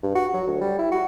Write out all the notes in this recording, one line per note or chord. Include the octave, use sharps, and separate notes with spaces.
G2
F#4
F#3
D2
G3
E4
F#4